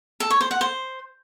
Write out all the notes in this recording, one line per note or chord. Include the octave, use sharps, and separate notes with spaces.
A4
C#5
C5
F#5
C5